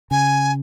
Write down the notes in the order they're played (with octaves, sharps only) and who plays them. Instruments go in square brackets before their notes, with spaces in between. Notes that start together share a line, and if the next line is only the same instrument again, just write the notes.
[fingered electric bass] C#3 [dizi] G#5